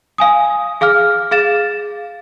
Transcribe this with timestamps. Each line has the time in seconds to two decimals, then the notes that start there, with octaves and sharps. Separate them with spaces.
0.18 F5 G#5 D#6
0.81 G#4 F5 D6 F6
1.31 G#4 F5 A6 E7